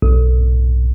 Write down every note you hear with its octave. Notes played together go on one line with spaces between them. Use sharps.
B1